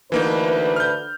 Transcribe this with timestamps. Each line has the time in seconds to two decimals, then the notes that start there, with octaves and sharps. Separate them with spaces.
0.12 D2 E3 A#3 D#4 B4
0.76 F6 G6